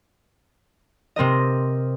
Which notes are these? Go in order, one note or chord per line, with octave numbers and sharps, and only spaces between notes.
C3 C4 A#4 D#5